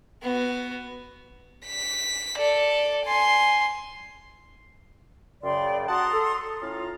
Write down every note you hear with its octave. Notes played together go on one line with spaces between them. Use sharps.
B3 F#4
B6
A4 D5
G#5 C6
F#2 C#3 D5 G5 C6
F#4 F#5 A5 A#5 C6 D#6
A4
A2 C#4 F4 A#5